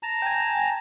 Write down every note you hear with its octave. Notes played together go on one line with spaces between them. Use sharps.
A5 A#5
G5 G#5